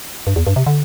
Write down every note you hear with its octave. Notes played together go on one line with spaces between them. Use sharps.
G2
E2
G2
C3
D3